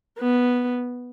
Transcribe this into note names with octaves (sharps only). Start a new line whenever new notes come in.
B3